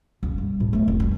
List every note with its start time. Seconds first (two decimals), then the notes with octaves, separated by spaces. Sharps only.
0.23 F#1 A#3
0.38 G3
0.60 A2
0.73 A3 B3
0.88 F1
1.00 G2